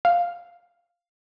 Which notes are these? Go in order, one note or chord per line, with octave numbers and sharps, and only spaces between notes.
F5